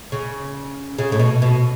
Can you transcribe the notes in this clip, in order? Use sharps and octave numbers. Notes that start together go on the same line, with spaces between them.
C#3
C#3
A2
B2
B2